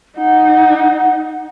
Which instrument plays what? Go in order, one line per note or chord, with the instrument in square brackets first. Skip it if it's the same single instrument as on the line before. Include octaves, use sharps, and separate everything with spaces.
[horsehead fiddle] D#4 [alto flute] F#5